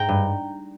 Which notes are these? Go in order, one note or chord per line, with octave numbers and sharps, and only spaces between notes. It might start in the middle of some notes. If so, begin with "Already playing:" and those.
Already playing: G#2 G5 A#5
G2